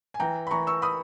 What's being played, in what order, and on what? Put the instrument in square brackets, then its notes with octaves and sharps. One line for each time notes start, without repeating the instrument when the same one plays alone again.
[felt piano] G#5
E3 G5 A#5
B5
E3 A#5 C#6
C#6 E6
B5 D#6